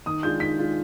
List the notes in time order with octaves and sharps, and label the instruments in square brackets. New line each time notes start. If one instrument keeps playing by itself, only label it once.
[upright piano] D#3 D#6
G#3 D4 F4 G6
D#3 B6
G#3 D4 F4